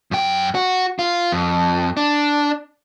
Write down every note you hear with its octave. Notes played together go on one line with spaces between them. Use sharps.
F#2 G5
F#4
F4
F2
D4